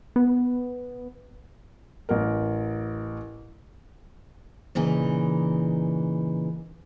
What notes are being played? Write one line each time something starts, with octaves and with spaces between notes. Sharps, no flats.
B3
A1 A#4
A#2 C#3 E3 D#4